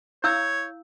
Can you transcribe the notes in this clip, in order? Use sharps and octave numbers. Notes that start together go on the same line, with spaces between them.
E4 C#5 F5 E6 G6